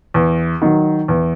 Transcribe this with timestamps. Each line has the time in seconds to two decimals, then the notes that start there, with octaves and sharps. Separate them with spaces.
0.14 E2
0.62 D#3 F#3
1.08 E2